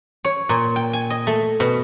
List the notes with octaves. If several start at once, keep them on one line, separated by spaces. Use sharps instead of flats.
C#5
A#2
G5
G#5
D#5
A3
B2